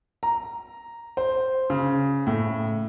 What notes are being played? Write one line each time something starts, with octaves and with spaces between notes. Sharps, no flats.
A#5
C5
C#3
A2